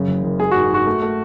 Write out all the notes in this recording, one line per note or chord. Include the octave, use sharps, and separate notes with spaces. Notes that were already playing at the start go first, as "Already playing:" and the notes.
Already playing: F#2 C#3
F#1
F#1
G#3 G#4
F#4
G#2
G#2 F#4
A3
A3